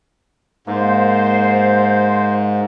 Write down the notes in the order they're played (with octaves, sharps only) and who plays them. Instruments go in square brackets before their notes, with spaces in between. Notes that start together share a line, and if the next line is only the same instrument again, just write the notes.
[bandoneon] G#2 [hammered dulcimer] A#3 [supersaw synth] C5